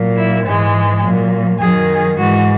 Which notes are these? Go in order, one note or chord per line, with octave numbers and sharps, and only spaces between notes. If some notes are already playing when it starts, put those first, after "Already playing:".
Already playing: A#2 F#3
E4
G#2 E3 G#3
A#2 F#3
F#2 D#3 F#3 G#4
G#2 E3 G#3 F#4